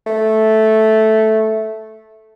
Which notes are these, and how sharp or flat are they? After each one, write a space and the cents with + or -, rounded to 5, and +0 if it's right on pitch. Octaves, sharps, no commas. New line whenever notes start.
A3 -5